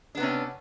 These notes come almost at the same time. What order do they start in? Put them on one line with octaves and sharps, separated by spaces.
D4 B3 C3 C#4